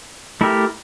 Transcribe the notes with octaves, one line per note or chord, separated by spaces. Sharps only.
A3 E4 G4 A#4